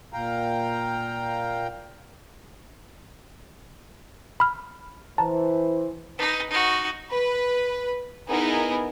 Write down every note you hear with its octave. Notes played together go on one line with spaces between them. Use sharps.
A#2 F5 G5 A#5
B5 F6
E3 C5 A5 A#5
D#4 B4
D#4 F#4
B4
B3 D#4 E4 G#4 A#4